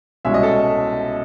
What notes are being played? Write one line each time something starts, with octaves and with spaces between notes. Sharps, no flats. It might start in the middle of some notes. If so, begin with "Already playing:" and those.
C2 B2 G#3 C#4 E5
D#5
A4